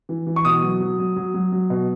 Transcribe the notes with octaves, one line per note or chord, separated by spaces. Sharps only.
E3
E3
C#6
B2 D#6
F#3
F#3
F#3
F#3
F#3
F#3
B2